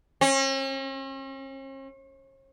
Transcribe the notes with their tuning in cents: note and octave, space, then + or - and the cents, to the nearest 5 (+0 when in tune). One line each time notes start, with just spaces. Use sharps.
C#4 -45